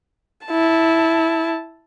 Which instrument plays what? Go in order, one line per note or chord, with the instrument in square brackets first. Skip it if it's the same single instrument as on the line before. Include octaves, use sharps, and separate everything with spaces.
[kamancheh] E4 A5